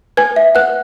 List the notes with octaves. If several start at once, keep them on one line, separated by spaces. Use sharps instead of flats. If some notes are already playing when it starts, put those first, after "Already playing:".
B4 G#5 G#6
E5
B4 F#5 F#6